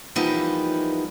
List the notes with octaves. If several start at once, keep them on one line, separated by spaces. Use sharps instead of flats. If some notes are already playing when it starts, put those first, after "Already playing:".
E3 F3 G3 A#3 B3 D#4